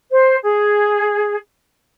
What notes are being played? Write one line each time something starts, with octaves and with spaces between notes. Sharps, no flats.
C5
G#4